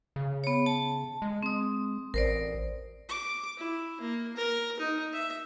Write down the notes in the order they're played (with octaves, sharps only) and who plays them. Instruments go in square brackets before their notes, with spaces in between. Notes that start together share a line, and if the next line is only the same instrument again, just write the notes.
[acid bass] C#3
[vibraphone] B3 C#5
A5
[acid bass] G#3
[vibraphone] C4 D#6
[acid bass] A1 [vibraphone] A#4 C5 D5
[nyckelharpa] D6
E4
A#3
A#4
D#4
E5